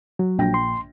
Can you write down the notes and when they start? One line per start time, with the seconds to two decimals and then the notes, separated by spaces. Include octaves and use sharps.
0.19 F#3
0.38 A#1 G5 A#6
0.54 C6